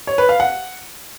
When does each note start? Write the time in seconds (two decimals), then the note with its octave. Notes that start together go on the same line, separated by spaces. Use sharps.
0.07 C#5
0.18 B4
0.29 F5
0.40 F#5